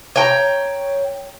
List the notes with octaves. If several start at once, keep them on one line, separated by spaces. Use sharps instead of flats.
C#5 G5 A#5